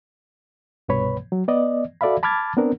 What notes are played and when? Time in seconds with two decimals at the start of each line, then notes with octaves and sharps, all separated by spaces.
0.89 C2 G2 B2 B4 C#5 B5
1.32 F#3
1.48 B3 D5 D#5
2.01 F#4 A4 D5 E5 F5 B5
2.23 A5 B5 D6 F6 G#6 A6
2.57 B3 C4 D4 A#4